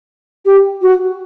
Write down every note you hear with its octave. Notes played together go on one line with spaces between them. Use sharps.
G4
F#4